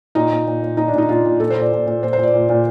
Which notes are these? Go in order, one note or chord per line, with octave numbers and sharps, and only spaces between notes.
A#2 D#4
A#2
A#2
A#2
A#2 D#4
D4
A#2 D#4
A#2 F4
A#2
A#2 A4
C5
A#2
D5
A#2
A#2
A#2 C5
A#2 C5
D5
A#2
A#2